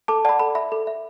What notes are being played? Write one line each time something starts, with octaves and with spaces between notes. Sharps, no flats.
A4 A5 D6
D5 F#5 A5 B5
A4 B5
E5 B5
A4
E5